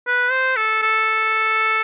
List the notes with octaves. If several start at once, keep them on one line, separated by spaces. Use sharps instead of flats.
B4
C5
A4
A4